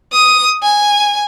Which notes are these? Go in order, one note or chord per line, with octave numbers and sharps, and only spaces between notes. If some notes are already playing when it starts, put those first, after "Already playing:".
D#6
G#5